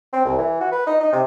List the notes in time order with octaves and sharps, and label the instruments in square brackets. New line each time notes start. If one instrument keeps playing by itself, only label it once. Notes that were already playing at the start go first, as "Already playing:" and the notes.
[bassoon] C4
C2
E3
F#4
B4
D#4
D#4
C3